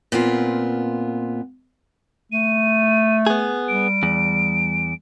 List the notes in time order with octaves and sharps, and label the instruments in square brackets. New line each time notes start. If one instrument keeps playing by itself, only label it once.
[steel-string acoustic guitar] A#2 B3 C4 F4
[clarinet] A3 [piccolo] D#7
[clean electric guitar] B3 G#4
[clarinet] G3 [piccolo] D7
[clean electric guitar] E2